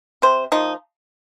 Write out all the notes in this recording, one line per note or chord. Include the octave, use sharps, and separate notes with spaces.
C3 C5
F3 A#3 D#4